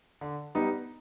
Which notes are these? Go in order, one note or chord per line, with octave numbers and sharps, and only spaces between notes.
D3
G3 B3 D#4